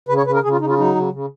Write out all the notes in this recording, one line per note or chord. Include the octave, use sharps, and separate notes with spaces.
C#3 B4
C#5
C#3 B4
A#4
C#3 G#4
F4
C#3 D#4
F4
F#3 D#4
C#3
C#3